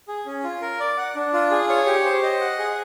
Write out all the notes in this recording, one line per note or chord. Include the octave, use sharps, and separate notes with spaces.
G#4
C#4
F4
A#4
D5
F#5
D4
F4
G#4
C#5
G4
C5
D#5
F#5
G#4